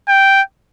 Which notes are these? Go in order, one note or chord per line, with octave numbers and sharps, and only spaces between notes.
G5